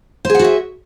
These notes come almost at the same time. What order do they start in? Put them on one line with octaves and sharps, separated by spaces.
C5 G#4 F#5 F#4 E5